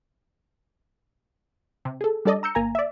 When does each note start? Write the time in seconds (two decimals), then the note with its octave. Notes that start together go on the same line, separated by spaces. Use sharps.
1.85 C3
2.01 G#4 A4
2.25 G3 D4 A4 D5 D#5
2.43 A#5 E6 G6 C#7
2.55 G1 A#3 G#5 A#5
2.75 D5 E5